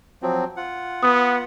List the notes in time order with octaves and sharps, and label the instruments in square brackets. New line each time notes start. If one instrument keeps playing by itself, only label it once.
[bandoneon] F3 F#3 C4
F4 F#5
[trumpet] B3 [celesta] D#6